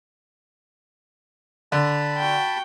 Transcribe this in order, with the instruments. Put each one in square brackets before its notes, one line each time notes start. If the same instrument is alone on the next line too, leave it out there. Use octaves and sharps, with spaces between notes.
[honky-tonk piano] D3 [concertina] A5 B5
[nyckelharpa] F#4 G5